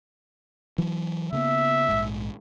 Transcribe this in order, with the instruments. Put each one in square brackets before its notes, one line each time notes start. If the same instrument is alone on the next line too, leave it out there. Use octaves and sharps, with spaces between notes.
[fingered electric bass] E3 F#3
[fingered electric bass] C#3 A#3 B3 [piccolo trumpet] E5
[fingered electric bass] A#1 G#2